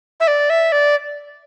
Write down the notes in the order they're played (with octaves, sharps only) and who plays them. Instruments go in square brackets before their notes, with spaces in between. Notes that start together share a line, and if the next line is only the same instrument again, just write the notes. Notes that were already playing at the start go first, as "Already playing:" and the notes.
[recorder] E5
D5
E5
D5